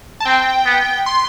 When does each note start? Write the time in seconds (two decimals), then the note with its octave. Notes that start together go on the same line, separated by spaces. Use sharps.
0.20 A5
0.26 C4 G5
0.66 B3
1.06 C6